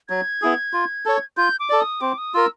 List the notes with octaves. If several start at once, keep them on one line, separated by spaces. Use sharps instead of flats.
F#3 G#6
B3 E4 G#4
F4
A4 C#5
F4 G6
D6
A4 D5
D#6
C4 D6
D#6
F4 A#4 E6